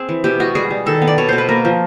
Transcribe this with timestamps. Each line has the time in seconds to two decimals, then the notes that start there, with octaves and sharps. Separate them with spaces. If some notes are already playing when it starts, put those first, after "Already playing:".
Already playing: C4 G#4
0.09 E3
0.24 B2 G4
0.40 G#3 F#4
0.55 G3 G#4
0.70 G3
0.86 D#3 A4
1.02 B3
1.08 D5
1.18 B2 C#5
1.29 B2 C5
1.38 B4
1.49 A#3 A#4
1.65 F3